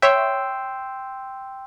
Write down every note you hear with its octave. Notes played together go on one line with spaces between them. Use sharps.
C#5 E5 G5 C6 E6